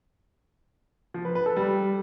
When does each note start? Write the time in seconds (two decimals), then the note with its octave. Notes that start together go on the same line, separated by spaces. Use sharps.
1.14 F3
1.25 B4
1.35 B4
1.46 A4
1.56 G3